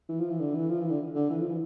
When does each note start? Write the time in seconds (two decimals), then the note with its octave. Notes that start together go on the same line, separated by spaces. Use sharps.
0.09 E3
0.19 F3
0.30 E3
0.40 D3
0.55 E3
0.70 F3
0.80 E3
0.90 D3
1.15 D3
1.30 E3
1.40 F3
1.49 E3